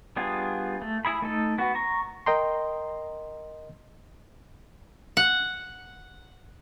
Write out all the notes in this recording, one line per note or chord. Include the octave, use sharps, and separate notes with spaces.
G3 B3 D4 F4 G#4
A3
E4 G#4 B5
A3 D#4 A4
B3 F#4
A#5 C#6
A#4 D#5 G5 A#5 C6
F#5